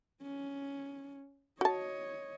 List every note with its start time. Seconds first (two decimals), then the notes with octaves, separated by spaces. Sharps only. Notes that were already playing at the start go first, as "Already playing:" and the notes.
0.22 C#4
1.61 F#4 C#5 D#5 A5